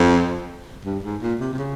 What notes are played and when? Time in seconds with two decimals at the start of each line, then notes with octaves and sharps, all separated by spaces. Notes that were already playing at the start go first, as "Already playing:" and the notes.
Already playing: F2
0.85 G2
1.03 G#2
1.22 A#2
1.40 C3
1.53 C3
1.58 C#3